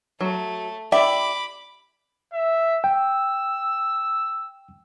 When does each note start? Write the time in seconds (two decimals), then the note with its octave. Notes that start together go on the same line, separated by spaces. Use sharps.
0.21 F#3 A3
0.92 E4 G4 D5 E5 G5 B5 D6
2.33 E5
2.84 G5 E6